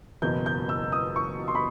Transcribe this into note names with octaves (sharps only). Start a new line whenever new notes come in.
F#1 E2 B2 G6
G6
E6
D#6
C#6
C6
B5